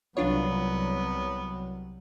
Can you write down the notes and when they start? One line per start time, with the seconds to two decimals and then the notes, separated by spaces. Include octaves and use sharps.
0.17 C2 F#3 G3 B3 D4 F4 C#5